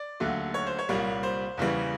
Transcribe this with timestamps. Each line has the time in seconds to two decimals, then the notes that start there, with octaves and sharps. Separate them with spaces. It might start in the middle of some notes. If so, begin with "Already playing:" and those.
Already playing: D5
0.20 D#2 D3 F#3 A3
0.54 C#5
0.66 C5
0.79 C#5
0.89 C2 A#2 G3 A#3
1.23 C5
1.57 E2 C#3 E3 G3